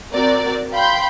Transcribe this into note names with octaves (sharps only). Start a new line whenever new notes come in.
C4 F#4 A#4 D5
F5 G5 B5 C6 G6